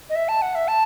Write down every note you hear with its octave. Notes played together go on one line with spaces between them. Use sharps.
D#5
E5
A5
F#5
E5
A5